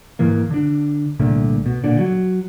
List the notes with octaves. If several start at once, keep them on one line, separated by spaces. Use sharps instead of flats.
G#2 D#3 E3 A#3
D3 D4
C2 A#2 D3 A3
B2
A#2 D3
F#3